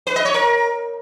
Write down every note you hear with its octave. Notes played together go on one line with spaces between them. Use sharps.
B4
D#5
C#5
A#4